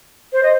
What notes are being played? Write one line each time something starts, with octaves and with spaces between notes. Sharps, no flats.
C5
D#5